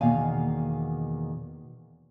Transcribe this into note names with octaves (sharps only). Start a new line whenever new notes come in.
E2 B2 D#3 A#3 F5 G#5